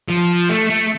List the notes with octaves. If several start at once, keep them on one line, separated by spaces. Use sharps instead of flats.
F3
A3
A3